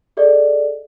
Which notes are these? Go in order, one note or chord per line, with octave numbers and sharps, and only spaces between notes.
G#4 A4 D5 D#5